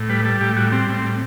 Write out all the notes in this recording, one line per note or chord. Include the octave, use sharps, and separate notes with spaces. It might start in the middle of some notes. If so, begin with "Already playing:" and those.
Already playing: A2
G3 B4
G3 A4
A2 G4
G3 F#4
G3 C4
A2 C4
G3